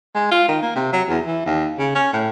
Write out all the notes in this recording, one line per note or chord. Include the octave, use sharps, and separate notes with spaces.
G#3
F4
D#3
A#3
C3
F#3
E2
E3
D#2
C#3
C#4
A2